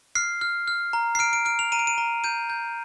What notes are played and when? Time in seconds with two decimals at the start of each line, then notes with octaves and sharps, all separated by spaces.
0.15 F6 C7
0.41 F6
0.68 F6
0.93 A#5
1.15 C7
1.19 F6 D7
1.33 D7
1.45 F6 D7
1.59 F7
1.72 A#5 D#7
1.79 D7
1.87 D#7
1.98 A#5
2.24 G6 D#7
2.50 G6